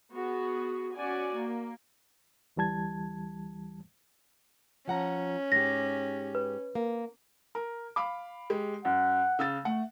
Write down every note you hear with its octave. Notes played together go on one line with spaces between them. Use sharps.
B3 F#4 G#4
C#4 F#4 D5 G#5
A#3
D2 E3 G3 A5 G#6
F3 C#4 F#5 A#5
G#2 G4 A#6
B4
A#3
A#4
F5 B5 D6
G#3 G4
F#2 F#5
C#3 E6 A6
A3 F#5